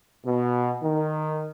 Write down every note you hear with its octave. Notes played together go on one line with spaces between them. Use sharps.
B2
D#3